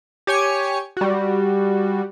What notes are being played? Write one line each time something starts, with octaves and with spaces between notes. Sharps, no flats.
G4 C#5 G#5 C#7
G3 F#4